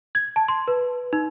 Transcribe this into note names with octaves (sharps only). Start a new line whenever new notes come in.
G#6
A5
C6
B4
D#4